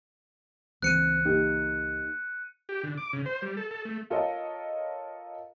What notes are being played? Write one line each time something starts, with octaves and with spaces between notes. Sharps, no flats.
C#2 E3 C4 F#6 C#7 D#7
A#3 D#4 G4
G4
D3
D6
C#3
C5
G3
A4
A4
A3
F4 A4 A#4 C#5 D#5 F5